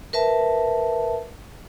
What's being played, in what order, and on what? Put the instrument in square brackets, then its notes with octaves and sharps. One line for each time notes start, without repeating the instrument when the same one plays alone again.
[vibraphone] A#4 B4 E5 A5